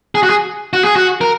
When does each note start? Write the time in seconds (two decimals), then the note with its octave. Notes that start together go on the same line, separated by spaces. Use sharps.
0.15 G#4
0.23 F#4
0.30 G#4
0.73 F#4
0.84 G#4
0.96 F#4
1.21 A#4